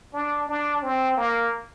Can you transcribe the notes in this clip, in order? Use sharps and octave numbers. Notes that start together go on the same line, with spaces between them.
D4
D4
C4
A#3